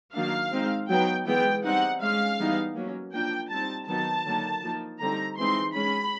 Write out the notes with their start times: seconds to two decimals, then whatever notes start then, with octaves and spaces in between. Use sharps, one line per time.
0.14 D#3 F#3 A#3 D4 F5
0.51 G#3 C4 D#4
0.89 F#3 B3 D#4 G5
1.26 E3 G#3 B3 G5
1.64 G3 C4 D#4 F#5
2.01 G#3 C#4 F5
2.38 E3 G3 B3 D#4
2.76 F#3 A#3 C#4
3.14 F3 A#3 D4 G5
3.50 G3 C4 D#4 A5
3.88 D#3 F#3 B3 D#4 A5
4.25 D3 F#3 A#3 D#4
4.63 F3 A#3 D#4
5.00 D3 G3 C4 D#4 A#5
5.37 E3 G#3 C4 D#4 C6
5.74 G#3 C#4 B5